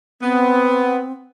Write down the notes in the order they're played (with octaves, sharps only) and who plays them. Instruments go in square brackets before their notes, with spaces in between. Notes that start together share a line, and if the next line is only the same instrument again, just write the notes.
[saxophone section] B3 [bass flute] C4